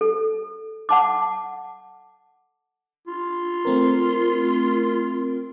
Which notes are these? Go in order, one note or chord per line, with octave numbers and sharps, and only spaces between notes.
A4
F#5 A5 D6
F4
A3 C4 A#4